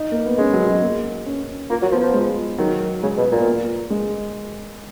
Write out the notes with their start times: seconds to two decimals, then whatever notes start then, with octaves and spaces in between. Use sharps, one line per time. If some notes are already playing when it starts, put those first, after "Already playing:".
Already playing: D#4
0.11 A#3
0.26 B3
0.38 G#3 C#4
0.53 F#3
0.67 F#3
0.82 A#3
1.26 C#4
1.70 A#3 F4
1.82 F#3
1.92 F3 B3
2.03 F3
2.14 G#3
2.58 D#3 F#3
3.02 C#3 G#3
3.18 B2
3.32 A#2 B3
3.47 A#3
3.90 G#3